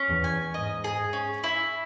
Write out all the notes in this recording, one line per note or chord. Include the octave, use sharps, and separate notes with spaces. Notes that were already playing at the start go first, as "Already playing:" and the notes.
Already playing: C#4
E2
G#5
G#2 D#5
G#4
C#4
E4